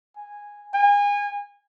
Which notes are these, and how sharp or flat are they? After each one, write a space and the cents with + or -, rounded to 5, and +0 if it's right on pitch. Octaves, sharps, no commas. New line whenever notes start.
G#5 -10
G#5 -30